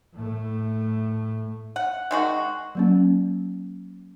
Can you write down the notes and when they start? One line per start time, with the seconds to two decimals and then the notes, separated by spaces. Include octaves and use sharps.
0.13 A2 A3
1.76 F#5
2.11 D#3 G#3 F#4
2.75 F#3 A#3 C#4